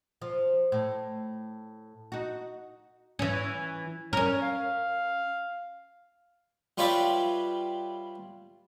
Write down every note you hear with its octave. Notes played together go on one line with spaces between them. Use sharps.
F3
A2
D#4 F#4
E3 C#4
C#4 A#4 C#5
F5
G3 F4 B4 C#5 D5 E5